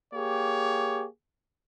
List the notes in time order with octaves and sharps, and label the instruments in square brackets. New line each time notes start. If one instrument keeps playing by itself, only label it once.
[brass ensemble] A#3 G4 G#4 C#5